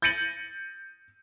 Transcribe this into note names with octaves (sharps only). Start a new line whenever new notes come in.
G6 A6 A#6 C#7 D#7 F#7